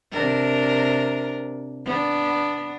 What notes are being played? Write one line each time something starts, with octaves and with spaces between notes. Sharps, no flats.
C3 D4 A#4
B3 D4